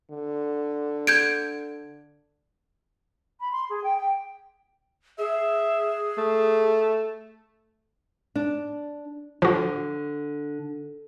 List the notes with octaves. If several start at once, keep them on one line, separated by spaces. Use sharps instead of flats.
D3
G6 G#6 D7
B5
C6
G#4
G5
G5
G#4 E5
A3
D4
D3 F3 F#4